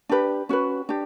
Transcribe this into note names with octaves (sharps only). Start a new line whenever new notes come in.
D4 G4 B4
C#4 F#4 B4
D4 G4